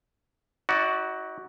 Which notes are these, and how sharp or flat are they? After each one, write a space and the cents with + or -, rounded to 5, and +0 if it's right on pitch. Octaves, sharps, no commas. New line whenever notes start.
D#4 +45 F#4 +10 D5 +0